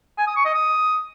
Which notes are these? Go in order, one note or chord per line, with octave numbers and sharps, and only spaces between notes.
G#5
D#6
C#6
D#5
D#6